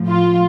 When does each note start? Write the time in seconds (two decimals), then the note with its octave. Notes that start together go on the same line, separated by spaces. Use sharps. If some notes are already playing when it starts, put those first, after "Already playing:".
Already playing: A2 F3
0.09 F4